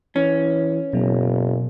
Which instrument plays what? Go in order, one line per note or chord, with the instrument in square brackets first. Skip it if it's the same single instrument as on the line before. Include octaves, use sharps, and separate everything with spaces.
[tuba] E3 [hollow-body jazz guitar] C#4
[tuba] F#1 [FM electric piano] B2 F#3